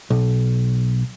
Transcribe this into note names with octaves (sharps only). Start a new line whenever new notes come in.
B1